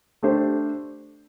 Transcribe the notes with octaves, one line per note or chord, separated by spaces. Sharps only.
A3 D4 G4 C5